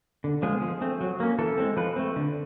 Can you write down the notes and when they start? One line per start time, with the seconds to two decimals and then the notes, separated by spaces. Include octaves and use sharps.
0.24 D3
0.42 F3 G#3 B3 G#4
0.61 F3
0.81 A3 C4
1.01 F#3
1.20 A#3 C#4
1.39 E3 A4
1.58 G#3 C4
1.77 F3 B4
1.96 A3 C4
2.16 D3